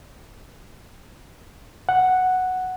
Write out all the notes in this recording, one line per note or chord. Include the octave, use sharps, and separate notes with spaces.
F#5